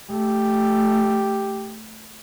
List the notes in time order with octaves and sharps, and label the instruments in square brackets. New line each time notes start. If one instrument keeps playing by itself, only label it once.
[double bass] A3 [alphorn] G4